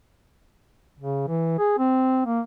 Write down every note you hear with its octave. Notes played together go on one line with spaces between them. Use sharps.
C#3
E3
G#4
C4
A#3